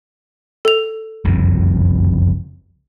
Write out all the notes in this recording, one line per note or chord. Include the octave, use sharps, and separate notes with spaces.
A4 F7
F#1 C2 F2